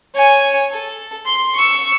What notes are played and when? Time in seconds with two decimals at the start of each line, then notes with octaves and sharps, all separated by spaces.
0.15 C#5 G#5
0.71 A4
1.25 C6
1.55 C#6 E6